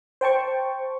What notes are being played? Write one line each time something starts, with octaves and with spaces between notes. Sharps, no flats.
C5 G5 A5 C#6